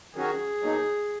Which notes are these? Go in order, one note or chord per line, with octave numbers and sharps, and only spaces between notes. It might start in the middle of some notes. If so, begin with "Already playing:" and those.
D#3 F#3 C#4 F#4 G#4
B2 F#3 A#3 D#4